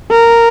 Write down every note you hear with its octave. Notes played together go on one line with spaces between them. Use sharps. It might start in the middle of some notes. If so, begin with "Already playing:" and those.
A#4